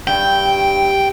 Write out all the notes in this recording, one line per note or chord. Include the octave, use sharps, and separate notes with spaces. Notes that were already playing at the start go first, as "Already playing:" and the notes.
G2 G5